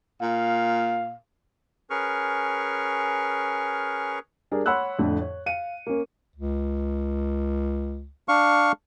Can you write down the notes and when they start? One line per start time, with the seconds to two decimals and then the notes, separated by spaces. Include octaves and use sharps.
0.22 A#2 F5
1.90 C#4 G#4 A#4 B4 C#6 F6
4.51 G3 D4 G#4 A#4
4.66 C#5 F#5 B5 C6 E6 F#6
4.99 F2 A2 D3
5.21 C#5
5.46 F5 C#7 D#7
5.87 A#3 C#4
6.36 C#2
8.29 D4 F5 C#6